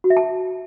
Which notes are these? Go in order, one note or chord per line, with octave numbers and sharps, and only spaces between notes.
F#4
E5
A5